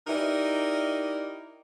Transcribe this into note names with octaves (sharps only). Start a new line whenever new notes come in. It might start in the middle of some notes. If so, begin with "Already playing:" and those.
D#4 E4 G4 A#4 D5 D#5